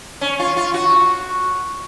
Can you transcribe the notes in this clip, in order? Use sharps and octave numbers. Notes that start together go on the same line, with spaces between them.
C#4
F4
F4
F#4